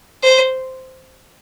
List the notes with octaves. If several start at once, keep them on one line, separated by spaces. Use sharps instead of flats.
C5